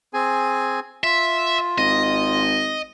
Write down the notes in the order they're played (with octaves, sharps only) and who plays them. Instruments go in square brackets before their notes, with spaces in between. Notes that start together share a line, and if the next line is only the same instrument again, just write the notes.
[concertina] C4 G#4 G#5
[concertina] F4 [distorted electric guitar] E5
[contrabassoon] G#1 [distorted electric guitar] D#5